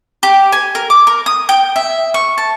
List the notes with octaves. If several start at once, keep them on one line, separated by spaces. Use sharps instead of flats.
G4
G#5
A#4
D6
A#4
D#6
G5
E5
C#6
A5